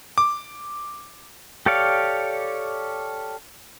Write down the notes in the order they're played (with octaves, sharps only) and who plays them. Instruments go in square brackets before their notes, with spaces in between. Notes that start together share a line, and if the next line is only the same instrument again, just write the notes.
[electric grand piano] D6
[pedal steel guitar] G4 A4 C#5 D5 F5